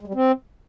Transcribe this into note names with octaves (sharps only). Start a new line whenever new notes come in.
G#3
G3
C4